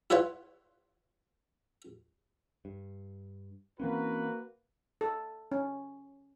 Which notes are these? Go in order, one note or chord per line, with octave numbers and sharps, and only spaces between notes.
E4 F4 B4 C#5 F#5
G2
E3 A#3 C4 C#4 F#4 B4
A4
C#4